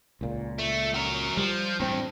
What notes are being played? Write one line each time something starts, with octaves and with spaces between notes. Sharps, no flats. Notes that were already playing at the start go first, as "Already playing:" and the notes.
C#2 A#2
A3
F#4 A#4
F3 G3
A1 G2 C4